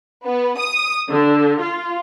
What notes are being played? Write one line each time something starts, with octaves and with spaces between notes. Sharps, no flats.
B3
D#6
D3
F4